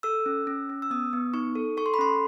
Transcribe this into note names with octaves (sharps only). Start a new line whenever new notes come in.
A4 E6
C#4
C#4
C#4
E6
B3 D#6
B3
D#4 C#6
A4
A4 C#6
C6
B5
C#4 C6